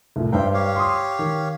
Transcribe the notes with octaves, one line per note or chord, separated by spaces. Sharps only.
C2 A2
G2 D4 C5 E5 F5 G5
G4 C#5 F5
C6 D#6
D#3